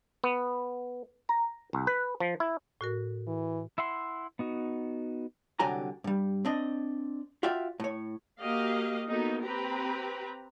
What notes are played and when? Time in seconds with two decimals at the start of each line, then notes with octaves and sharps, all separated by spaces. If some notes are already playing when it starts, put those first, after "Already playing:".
0.24 B3
1.29 A#5
1.73 C2
1.87 B4
2.20 F3
2.40 E4
2.81 A2 F#4 A#4
3.27 E3
3.78 E4 E5 F#5 C6
4.39 B3 D#4 F#4
5.59 C2 D3 F#3 G4 G#5 A#5
6.04 G2 G3
6.45 C4 D4 D#5
7.43 F4 F#4 D5 E5 F5 G5
7.80 A2 C#5
8.40 A#3 F#4 G4 D#5 F5
9.08 A#3 B3 D#4 F#4 A4
9.41 C4 G4 B4 A#5